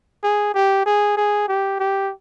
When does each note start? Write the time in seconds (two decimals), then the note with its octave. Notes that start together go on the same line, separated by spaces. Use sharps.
0.23 G#4
0.55 G4
0.86 G#4
1.17 G#4
1.48 G4
1.80 G4